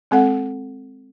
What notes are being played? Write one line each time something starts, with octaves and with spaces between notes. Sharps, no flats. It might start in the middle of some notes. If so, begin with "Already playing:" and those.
G#3 C4 A4 F#5